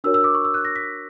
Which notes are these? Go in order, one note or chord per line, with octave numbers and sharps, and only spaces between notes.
D4 F#4 A#4 C#5 E6
E6
D6
C#6
E6
F#6
A#6
B6